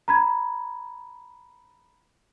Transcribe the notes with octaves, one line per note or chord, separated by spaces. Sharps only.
A#5 B5 G#6